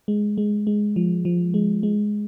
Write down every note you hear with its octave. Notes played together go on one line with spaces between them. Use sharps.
G#3
G#3
G#3
F3
F3
G#3
G#3